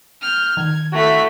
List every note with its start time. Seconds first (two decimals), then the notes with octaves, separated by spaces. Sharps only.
0.22 F6 G6
0.57 D#3 G#6
0.93 A3 E4 F#4 B6